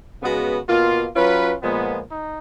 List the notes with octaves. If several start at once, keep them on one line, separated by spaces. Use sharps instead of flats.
C#3 G#3 B3 F#4
B2 A#3 F4
F#3 C#4 F4 B4
A#2 F3 G#3 B3
D#4